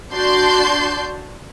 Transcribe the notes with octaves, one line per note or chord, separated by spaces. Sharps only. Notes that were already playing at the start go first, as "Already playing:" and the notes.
D4 F#4 D5 A5 C6 G6